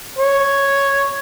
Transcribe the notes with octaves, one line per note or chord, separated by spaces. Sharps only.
C#5